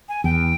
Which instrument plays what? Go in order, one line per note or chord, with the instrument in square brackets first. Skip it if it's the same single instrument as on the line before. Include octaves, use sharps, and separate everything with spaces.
[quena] G#5
[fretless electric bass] E2 [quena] G5